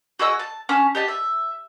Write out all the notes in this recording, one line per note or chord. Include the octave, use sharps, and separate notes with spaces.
F#4 G#4 D#5 E6
A5
C#4 A5 F6
G4 D#5 A5
E5